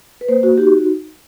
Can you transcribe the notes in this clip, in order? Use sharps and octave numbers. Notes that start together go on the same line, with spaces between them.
B4
A#3 C5
F#4
D#4 F#4 G4